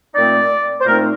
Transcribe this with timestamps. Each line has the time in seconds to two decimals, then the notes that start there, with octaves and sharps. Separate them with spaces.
0.14 A#2 A3 C4 D#4 D5
0.81 C5
0.86 A#2 A3 C4 D#4 A#4